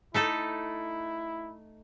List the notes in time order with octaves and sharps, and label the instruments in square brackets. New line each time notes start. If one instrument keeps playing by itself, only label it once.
[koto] A3 D#4 A4 [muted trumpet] E4